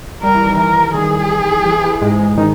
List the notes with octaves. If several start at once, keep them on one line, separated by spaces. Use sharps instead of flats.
G3 A#4
E3
D#3
E3 A#4
D#3 G#4
E3
E3
G#2 G#3
G#2 G#3
D#3 D#4